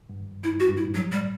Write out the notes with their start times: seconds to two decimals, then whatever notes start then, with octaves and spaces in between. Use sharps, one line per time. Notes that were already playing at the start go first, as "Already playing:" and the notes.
0.09 G2
0.43 G2 E4
0.60 F#4
0.68 G2
0.77 E4
0.84 A2
0.94 G2 F#3
1.12 A2 G3